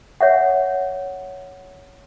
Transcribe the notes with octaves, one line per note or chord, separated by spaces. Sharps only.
C#5 E5 F#5